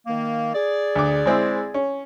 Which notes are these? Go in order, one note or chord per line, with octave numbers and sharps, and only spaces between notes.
D#3 A#3
G#4 D5
D2 D6
G#3 C4 E4
C#4